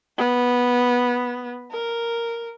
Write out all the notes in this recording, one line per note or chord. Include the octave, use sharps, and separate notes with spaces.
B3
A#4